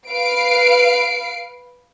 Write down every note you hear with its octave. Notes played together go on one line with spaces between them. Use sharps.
B4 F5 C7 D7